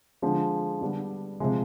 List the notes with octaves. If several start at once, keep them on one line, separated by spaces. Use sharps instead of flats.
D3 F3 G#3
D3 G3 B3 D4
C3 F3 G#3